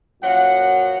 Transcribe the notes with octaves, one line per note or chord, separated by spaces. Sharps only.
F#2 A#2 F3 F#3 F#5